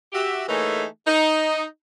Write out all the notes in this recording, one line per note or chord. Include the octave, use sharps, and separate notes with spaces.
F#4 G4 E5
E3 A3 A#3 D#4 G#4 C#5
D#4